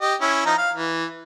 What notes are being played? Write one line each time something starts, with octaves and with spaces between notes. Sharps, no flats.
G4 D#5
C#4 E4
F3 D#4 A#5
F5
E3